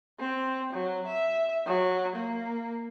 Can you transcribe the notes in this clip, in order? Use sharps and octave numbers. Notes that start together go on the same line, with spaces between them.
C4
F#3
E5
F#3
A#3